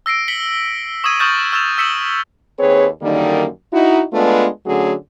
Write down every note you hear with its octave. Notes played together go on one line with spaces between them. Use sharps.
E6 A#6 C7 D7
B6 C#7 F#7 G7
C#6 D#6 E6 G#6 D#7
C#6 D#6 F6 G6 A6 F#7
C#6 E6 F6 A6 E7 F7
E6 B6 C#7 E7 F#7 G7
D#2 C4 G#4 B4 C#5
F#2 D3 D#3 G3 A#3 D#4
D#4 E4 F#4
G#3 A3 B3 D4 F4 B4
D3 F#3 A3 C#4 F#4 G#4